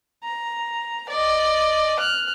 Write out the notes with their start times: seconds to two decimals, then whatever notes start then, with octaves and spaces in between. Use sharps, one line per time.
0.24 A#5
1.09 D5 D#5
1.99 F6 F#6